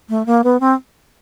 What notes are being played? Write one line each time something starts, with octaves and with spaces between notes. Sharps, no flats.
A3
A#3
B3
C4